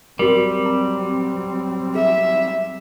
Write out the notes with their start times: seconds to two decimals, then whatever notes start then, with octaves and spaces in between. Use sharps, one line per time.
0.19 F#3 G3 C4 F#4 A#4
0.66 A#5
1.95 G#4 E5